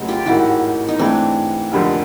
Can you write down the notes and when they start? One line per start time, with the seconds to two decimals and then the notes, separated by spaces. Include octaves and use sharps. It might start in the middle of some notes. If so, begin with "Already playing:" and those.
Already playing: F1 D#2 C#3 F#3 A3
0.08 F4 G4
0.26 A1 G#2 D#3 E4 F#4
0.88 D#4
0.99 G#2 E3 A3 C4 D4
1.72 F1 D#2 D3 F3